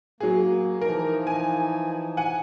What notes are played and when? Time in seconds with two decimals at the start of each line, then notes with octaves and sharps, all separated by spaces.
0.20 F#3 A#3 G#4
0.81 E3 F3 D#4 A#4
1.27 G#5
2.17 F#5 G#5